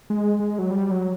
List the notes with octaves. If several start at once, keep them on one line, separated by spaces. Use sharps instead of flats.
G#3
G#3
F#3
G3
F#3